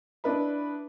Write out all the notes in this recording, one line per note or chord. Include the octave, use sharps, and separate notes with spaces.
D4 E4 B4 D#5 B5